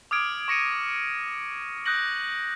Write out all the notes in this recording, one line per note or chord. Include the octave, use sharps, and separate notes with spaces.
D6 D#6 F6 G#6 D7
C#6 A#6 C#7 D#7
D#6 F#6 G6 A#6 F#7